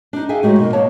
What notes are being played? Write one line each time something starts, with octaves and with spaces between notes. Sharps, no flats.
D4 D#4
G#4 E5 F5 G5 G#5
F#2 A2 G#3 D#4 F#4 G4
B2 E3 A#3
A#3 B3 C#5 A5